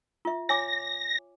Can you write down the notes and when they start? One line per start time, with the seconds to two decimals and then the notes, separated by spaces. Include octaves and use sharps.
0.25 F4 E5
0.49 C#5 G#5 D6 A#6